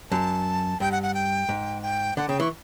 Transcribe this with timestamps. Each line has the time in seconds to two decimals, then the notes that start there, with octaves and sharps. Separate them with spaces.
0.11 F#2 A5
0.80 G2 G5
0.92 F#5
1.03 F#5
1.14 G5
1.49 G#2
1.82 G5
2.17 D3 F#5
2.29 C#3 G5
2.40 E3 C#6